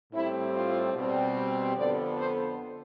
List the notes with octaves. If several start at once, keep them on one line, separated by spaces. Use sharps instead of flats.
A2 G3 C4 E4
F4
B2 G3 C4
F2 D3 F3 B3 D5
C5